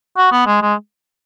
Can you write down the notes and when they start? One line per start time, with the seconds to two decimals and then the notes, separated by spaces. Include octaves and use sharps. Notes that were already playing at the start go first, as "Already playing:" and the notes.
0.17 F#4
0.32 B3
0.46 G#3
0.62 G#3